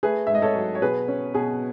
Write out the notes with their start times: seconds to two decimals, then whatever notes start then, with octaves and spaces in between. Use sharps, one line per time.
0.03 A3 G#4 B4
0.27 E5
0.30 G#2
0.35 D#5
0.42 A4 C#5
0.55 F#3
0.75 C#5
0.82 B2 G#4 B4
1.08 C#4
1.34 B2 G#4